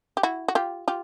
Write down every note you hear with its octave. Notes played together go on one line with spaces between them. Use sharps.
G4
E4 F#4
F#4
F4 G4
F4 G4